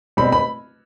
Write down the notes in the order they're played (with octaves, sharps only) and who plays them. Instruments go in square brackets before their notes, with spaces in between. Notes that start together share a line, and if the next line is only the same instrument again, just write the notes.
[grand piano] B2 G3 C4 [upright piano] B5
[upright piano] B5